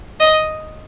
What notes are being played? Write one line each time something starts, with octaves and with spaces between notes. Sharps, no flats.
D#5